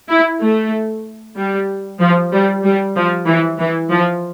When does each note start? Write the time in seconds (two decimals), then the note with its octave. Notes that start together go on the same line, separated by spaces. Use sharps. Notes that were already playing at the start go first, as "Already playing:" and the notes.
0.10 E4
0.42 A3
1.37 G3
2.01 F3
2.33 G3
2.64 G3
2.96 F3
3.28 E3
3.60 E3
3.91 F3